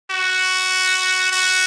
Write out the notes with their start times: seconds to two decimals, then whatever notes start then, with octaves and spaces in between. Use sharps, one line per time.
0.11 F#4
1.32 F#4